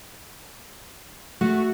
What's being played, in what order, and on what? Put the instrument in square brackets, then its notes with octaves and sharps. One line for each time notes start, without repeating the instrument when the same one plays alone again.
[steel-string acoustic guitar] A3 [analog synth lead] F#4